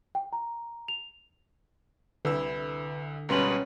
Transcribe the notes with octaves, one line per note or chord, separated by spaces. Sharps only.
G5
A#5
F7
C2 D3 E4 B4 E6
C#2 B2 G3 C#4 B4 A#5 C6 F#7